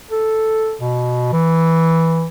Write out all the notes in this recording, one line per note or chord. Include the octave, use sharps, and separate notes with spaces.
A4
B2
E3